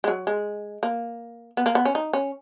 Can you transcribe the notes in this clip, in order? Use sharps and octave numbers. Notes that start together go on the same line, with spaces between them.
G#3
F#3
G#3
A#3
B3
A#3
B3
C#4
D#4
C#4